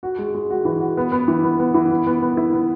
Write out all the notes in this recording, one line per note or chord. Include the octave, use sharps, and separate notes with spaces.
F#4
G#3
G#3
F#4
E3
F#4
B3
B3
E3
B3
B3
E3
B3
B3
B3
E4
B3